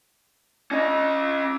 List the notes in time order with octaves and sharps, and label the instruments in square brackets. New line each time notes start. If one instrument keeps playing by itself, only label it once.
[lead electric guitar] C#4 D#5